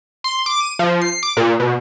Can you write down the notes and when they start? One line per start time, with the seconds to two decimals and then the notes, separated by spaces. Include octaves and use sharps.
0.24 C6
0.46 D6
0.61 D#7
0.79 F3
1.02 C7
1.23 D6
1.37 A#2
1.60 B2